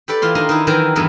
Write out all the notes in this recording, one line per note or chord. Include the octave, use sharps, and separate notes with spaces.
G4 A4 B4 D5
E3 F4 C6
D#3 D4 D#5 A#5 C6
D#3 D#4 E4
D#3 E3 F#3 A#4 G5
E2 G2 E3 B3 D#5